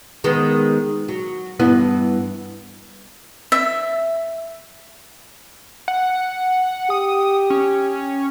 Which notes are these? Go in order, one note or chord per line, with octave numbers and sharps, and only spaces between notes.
D#3 G#3 B3
F#3
G2 E3 B3
E5
F#5
G4 D#6
C#4